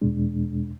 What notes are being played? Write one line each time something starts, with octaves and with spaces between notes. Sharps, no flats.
E2 B2 G#3 D4